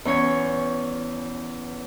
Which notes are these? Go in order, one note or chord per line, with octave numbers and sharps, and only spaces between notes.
E2 C#4 C#5